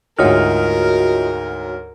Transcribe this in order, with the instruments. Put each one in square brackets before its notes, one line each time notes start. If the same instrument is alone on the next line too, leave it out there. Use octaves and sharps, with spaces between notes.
[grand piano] D2 G#2 [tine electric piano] F4 D#5 [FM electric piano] F#4 C#5 F6 [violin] A#4